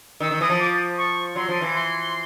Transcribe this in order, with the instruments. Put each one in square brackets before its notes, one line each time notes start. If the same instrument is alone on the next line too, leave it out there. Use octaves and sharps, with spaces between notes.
[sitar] D#3 [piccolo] E6
[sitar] D#3
[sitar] E3 [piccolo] D#6
[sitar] F3
[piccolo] D6
C#6
[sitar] F#3 [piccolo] C6
[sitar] F3
E3
[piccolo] C6